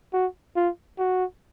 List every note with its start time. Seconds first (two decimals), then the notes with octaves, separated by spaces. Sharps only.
0.13 F#4
0.56 F4
0.99 F#4